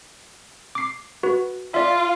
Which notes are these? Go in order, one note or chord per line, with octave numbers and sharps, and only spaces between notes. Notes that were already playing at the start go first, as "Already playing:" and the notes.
D6 C7
F#4 B4
F4 D5 E5